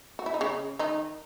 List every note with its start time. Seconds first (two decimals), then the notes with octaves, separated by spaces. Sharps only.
0.19 F#4
0.26 E4
0.34 D#4
0.41 C#3 C#4
0.79 D#3 D#4